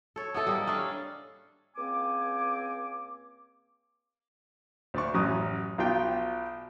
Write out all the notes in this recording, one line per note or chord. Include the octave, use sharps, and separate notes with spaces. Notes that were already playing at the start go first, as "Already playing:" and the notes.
A4 C#5
B3 E4 A4 D#5
G3 A#3 D#5
C#4 D4 A4 F5
C#2 A#3 C4 G#5 D6
D2 D5 C#6
A1 F#2 F#3 D#6
B1 B2 F4 G5